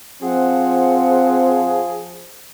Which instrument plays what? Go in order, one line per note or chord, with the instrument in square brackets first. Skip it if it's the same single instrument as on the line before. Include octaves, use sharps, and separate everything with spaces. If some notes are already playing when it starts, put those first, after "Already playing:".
[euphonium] F3 [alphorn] C4 [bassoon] G#4 [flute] F#5